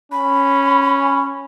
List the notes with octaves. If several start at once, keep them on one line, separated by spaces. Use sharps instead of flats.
C#4 B5